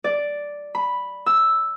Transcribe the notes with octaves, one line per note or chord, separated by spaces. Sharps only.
D5
B5
E6